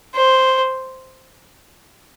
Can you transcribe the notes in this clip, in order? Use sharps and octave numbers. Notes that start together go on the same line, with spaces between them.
C5